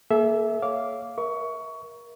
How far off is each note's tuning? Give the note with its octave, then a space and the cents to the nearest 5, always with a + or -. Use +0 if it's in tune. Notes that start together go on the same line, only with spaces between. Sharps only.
A#3 +0 A4 -45 E5 +0
C#5 +0 F5 +0 D6 -15
A#4 +30 E5 -35 C#6 +20